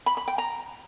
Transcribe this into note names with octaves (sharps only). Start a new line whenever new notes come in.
B5
B5
G5
A#5